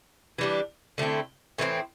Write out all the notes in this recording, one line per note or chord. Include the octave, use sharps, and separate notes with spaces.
E3 G3 D4
D3 A3 C4 E4
A2 E3 A3 C4